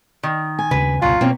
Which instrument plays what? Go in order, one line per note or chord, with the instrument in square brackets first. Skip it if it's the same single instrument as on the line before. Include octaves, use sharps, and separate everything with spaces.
[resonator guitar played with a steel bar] D#3
[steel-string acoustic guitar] G#5
[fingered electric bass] D#2 C#3 [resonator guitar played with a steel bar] B4
[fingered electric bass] G1 C#2 B2 [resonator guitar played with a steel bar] F#3 [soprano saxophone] F4
[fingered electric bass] B2 [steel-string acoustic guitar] A#3 C4 C#4